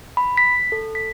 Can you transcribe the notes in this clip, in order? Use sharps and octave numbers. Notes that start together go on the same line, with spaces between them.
B5
B6
A4
B6